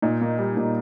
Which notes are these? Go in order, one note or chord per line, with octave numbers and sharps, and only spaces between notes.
A#2 D#4
A#3
G3
A#2